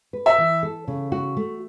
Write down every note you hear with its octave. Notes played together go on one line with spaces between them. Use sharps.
B4
E5
E3
A4
C#3
F#4
A3